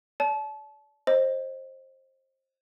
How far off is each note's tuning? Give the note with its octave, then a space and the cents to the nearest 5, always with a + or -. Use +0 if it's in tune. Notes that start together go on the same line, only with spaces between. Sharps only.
D5 -35 A5 -30
C5 +20 D#5 +0